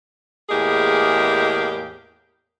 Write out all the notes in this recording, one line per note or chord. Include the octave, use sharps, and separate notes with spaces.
E2 A2 G#3 A#3 G4 G#4